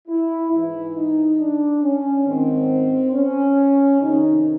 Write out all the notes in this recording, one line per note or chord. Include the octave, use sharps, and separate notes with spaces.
E4
G#2 E3 E4
D#4
D4
C#4
G#2 D#3 C4
C#4
F2 C3 D#3 D#4